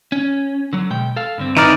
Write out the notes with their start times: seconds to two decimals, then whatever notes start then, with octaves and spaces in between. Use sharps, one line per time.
0.12 C#4
0.73 D3 F#3
0.90 B2 G#3 G5
1.16 A4 F5
1.38 G2 D3 C4
1.57 E3 D#4 D5 A#5 F6